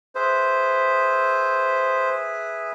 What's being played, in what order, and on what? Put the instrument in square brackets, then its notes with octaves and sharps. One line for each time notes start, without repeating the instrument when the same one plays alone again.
[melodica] G#4 B4 E5 [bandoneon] C5